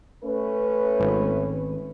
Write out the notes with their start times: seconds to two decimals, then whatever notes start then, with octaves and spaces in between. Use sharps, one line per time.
0.24 A3 C#4 B4
1.00 G#1